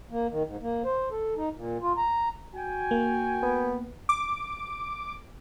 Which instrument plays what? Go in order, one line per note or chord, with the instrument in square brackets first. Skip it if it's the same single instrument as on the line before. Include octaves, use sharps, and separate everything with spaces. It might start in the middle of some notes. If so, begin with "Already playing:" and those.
[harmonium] A#3
D#3
G#2
A#3
C5
A4
D#4
A#2
F4
A#5
[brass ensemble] F#4 G5 G#5
[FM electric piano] A#3
[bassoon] B3
[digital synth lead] D6